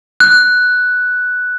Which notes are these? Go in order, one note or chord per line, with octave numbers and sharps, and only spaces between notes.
F#6